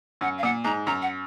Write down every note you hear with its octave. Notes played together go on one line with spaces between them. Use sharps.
F#2 F#5
F5
A#2 F#5
G#2 A#5
F#2 A#5
F#5